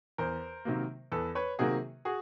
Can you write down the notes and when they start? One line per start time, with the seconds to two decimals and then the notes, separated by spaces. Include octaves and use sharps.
0.18 E2 A#4 C5
0.65 C3 D#3 F#3 A#3
1.12 E2 A4 B4
1.35 B4 C#5
1.59 C3 D#3 F#3 A#3 F#4 G#4
2.05 F#4 G#4